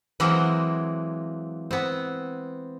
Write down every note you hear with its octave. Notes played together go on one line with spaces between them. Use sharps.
E3 F#3 G#3 A#3 C4
B3 C4